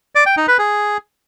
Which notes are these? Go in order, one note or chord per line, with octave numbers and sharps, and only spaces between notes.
D5
G5
D#4
B4
G#4